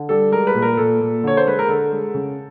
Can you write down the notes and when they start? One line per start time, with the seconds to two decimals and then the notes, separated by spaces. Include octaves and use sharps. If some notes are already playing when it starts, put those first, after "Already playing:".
Already playing: D3
0.09 G3 A4
0.32 G#3 A#4
0.47 B4
0.55 A#2
0.62 A#4
0.77 A#2 A4
1.01 A#2
1.24 D3 C#5
1.37 C5
1.46 G#3 B4
1.59 A#4
1.69 D3 A4
1.92 G#3
2.15 C#3